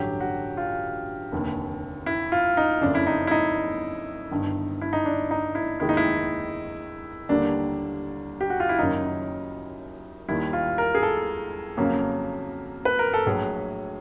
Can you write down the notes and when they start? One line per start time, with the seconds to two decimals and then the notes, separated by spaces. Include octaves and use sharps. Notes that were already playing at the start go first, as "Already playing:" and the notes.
Already playing: A1 G2 D3 F#3 G4
0.20 F#4
0.57 F4
1.32 F1 D#2 D3
2.06 E4
2.32 F4
2.57 D#4
2.81 F#1 F2 C#3 D4
2.95 E4
3.07 D#4
3.27 E4
3.31 D#4
4.31 G1 G2 D#3
4.81 E4
4.93 D#4
5.05 D4
5.31 D#4
5.55 E4
5.80 F1 D#2 D#3 G#3 E4
5.89 D#4
5.97 E4
7.29 D#2 D3 G3 A#3 D4
8.41 G4
8.50 F#4
8.60 F4
8.69 E4
8.79 F#1 F#2 D#3 F#3 D#4
10.28 D#2 D#3 G3 E4
10.53 F4
10.78 A#4
10.95 G#4
11.03 A4
11.77 F2 C#3 F#3 A#3
12.85 B4
12.99 A#4
13.13 A4
13.26 A#1 A2 F#3 G#4